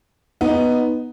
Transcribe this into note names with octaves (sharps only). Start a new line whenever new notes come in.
B3 D#4